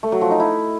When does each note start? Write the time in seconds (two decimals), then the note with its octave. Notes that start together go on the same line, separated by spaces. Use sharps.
0.03 A3
0.12 F#3
0.21 F3
0.31 D#4
0.40 E4